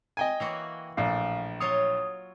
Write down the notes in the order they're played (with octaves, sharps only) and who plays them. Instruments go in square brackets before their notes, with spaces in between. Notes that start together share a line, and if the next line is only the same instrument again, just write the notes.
[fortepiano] D#5 G5 G#5
[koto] E3 A#3 F#4
[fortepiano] A#1 A2 [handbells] F5
[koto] F#3 F4 C#5 [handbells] D#6